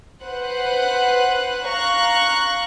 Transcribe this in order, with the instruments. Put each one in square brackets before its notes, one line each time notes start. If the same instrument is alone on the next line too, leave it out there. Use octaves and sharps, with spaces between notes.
[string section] B4 C5 F#5 F#6
F5 A#5 C#6 F#6